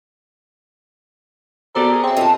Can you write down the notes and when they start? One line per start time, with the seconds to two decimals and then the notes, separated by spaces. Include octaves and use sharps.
1.75 B3 F#4 G4 A4 A#4 C5 D5
1.92 G#4
2.04 C4 C#5 E5
2.17 C3 F4 A4 D#5 A5